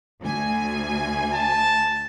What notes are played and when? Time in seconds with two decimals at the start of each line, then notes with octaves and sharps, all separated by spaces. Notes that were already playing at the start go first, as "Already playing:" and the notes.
0.21 D2 G#5
1.34 A5